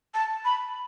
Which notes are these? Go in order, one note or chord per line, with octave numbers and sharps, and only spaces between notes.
A5
B5